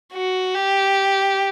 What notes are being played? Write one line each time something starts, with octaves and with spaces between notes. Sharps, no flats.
F#4
G4